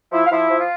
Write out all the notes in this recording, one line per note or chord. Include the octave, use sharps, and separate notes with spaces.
F3 E4 E5
F5
F3 E4 E5
F3
F4 F5